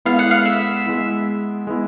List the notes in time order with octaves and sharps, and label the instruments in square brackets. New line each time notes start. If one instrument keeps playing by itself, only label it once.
[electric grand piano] G#3 B3 E4 [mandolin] F5
[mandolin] F#5
F5
E5
[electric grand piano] G#3 B3 E4
G#3 B3 E4